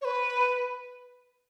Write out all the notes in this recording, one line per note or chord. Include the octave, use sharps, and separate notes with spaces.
C#5
B4